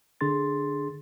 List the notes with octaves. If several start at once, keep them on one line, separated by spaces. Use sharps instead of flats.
D3 D4 G#4 C6 A6